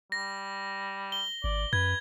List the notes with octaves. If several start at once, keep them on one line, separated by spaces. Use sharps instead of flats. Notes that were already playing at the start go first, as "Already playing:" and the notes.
G3 A#6
G7
G#1 D5
F#2 B4 G#6